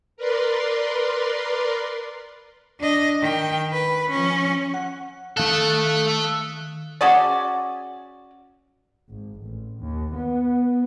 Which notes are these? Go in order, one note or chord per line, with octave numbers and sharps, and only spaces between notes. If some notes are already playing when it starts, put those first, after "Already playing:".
A#4 B4 D5 C6
D4 D#5
D#3 G5
B4
F3 C#4
F#5
D#3 A3 A4 F5 F#6
C#4 F#4 G#4 D5
G#1
A1
D#2
B3